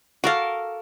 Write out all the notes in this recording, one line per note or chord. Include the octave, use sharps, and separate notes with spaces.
F#4 A4 A#4 F5 D6